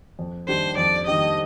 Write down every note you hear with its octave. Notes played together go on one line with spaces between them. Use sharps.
F2
D#3 G3 D4 G4 C5
F2 D5
D#3 G3 D4 G4 D#5